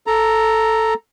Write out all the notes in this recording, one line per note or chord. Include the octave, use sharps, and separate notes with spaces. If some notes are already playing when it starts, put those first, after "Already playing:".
A4 A#5